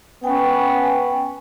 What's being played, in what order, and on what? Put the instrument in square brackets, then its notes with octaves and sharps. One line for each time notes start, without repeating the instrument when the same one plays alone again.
[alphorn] B3 [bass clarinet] C#4 [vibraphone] G5 G#5